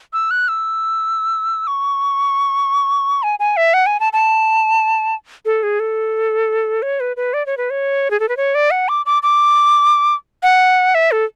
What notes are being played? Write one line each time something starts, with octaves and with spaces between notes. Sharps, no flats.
E6
F#6
E6
C#6
G#5
G#5
E5
F#5
G#5
A5
A5
A4
G#4
A4
C#5
B4
B4
D5
C#5
B4
C#5
G#4
A4
B4
C#5
D5
F#5
D6
D6
D6
F#5
E5
A4